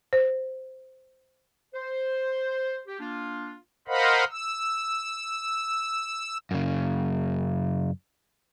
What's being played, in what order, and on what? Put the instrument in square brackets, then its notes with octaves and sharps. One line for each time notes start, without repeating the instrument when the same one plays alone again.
[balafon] C5
[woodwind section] C5
G4
A#3 D4 F4
[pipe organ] A#4 C5 D#5 F5 F#5 B5
E6
[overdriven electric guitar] F#2 C#3